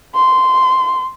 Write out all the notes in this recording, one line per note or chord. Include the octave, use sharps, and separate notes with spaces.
C6